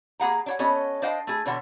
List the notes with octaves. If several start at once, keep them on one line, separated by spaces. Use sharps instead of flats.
A#3 G#4 F#5 A#5
D4 C#5 F#5
B3 C#4 A4 C#5 D#5
D4 C5 D#5 F5 G5
A3 G#4
B2 D3 E3 C#5 E5 F#5